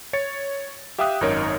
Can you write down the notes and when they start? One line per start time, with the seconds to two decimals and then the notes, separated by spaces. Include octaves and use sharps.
0.13 C#5 A6 C#7
0.98 G4 E5 F5 G5 D#6 F#6
1.21 G#1 F#2 D#4 A#4 C#5 D7